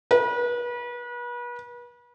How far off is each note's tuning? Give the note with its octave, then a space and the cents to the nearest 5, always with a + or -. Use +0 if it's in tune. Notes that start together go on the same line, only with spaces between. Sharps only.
B4 -35